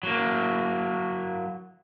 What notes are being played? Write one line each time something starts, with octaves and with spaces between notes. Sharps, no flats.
F#3 A#3